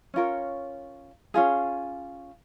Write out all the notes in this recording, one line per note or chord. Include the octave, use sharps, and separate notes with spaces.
C#4 F4 A#4 C#5
C#4 F4 G#4